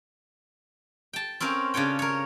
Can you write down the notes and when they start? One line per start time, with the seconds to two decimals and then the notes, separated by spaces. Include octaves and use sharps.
1.13 G5 A5
1.40 C4 C#4 A#4 C5 F5
1.74 C#3 D4 F4 C#5 G5
1.99 A#4 C#5